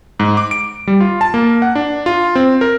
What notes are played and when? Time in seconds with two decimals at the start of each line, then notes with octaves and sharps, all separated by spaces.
0.20 G#2
0.37 D6
0.51 D7
0.87 G3
1.00 F4
1.21 A5
1.34 A#3
1.62 F#5
1.75 D4
2.06 F4
2.35 C4
2.61 A#4